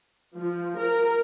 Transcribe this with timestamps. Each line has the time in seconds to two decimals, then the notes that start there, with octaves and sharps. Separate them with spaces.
0.37 F3
0.78 A#4